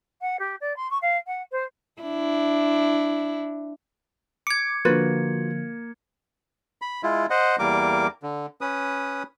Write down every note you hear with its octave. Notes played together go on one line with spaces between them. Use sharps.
F#5
G4
D5
C6
C#6
F5
F#5
C5
D4 E4
D6 G#6 C#7
D3 F3 A#3 F4 F#4 B4
B5
G#3 E4 F4
C5 D#5 F#5
E2 G3 A#3 A#4 D6
D3
C#4 B4 D#6